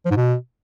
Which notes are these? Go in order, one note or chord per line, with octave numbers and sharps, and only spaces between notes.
F3
G#2
B2